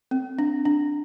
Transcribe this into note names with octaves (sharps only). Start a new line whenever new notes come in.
C4
D4
D4